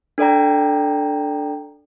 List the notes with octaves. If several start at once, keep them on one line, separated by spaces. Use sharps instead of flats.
D4 A4 D5 G5 A#5